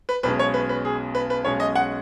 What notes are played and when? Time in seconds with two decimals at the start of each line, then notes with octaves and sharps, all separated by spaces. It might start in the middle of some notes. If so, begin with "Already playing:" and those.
0.09 B4
0.23 B1 B2 G#3 C#4 B4
0.39 C#5
0.54 B4
0.69 B4
0.85 G#4
1.15 B4
1.30 B4
1.44 B1 B2 G#3 C#4 C#5
1.60 D#5
1.75 F#5